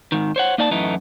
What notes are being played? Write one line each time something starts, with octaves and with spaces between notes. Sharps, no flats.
G#2 D#3
C5 C#5 F#5
A#3 D#4 D5 G#5 A5
F#2 A2 E3 A3 D#4